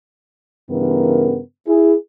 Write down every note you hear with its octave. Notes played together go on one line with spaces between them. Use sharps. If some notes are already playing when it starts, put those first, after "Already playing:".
G2 C#3 E3 B3 A#4
E4 G#4